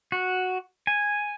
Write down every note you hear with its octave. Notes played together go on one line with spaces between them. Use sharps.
F#4
G#5